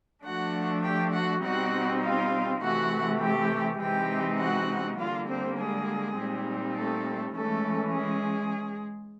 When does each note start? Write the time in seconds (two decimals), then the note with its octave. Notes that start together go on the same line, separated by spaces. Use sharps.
0.24 F3 A3 D4 F#4 F#5
0.83 G4 G5
1.13 F#4 F#5
1.43 B2 G3 C4 D#4 F#4 F#5
2.02 F4 F5
2.61 C3 E3 A3 F#4 F#5
3.20 G4 G5
3.80 C3 E3 G#3 C4 D#4 G4 G5
4.39 F#4 F#5
4.99 D3 G3 A#3 F4 F5
5.28 C4 C5
5.58 G#3 G#4
6.17 A#2 G3 C4 D#4
6.77 A3 A4
7.35 E3 G#3 A3 C#4 A4
7.95 G#3 G#4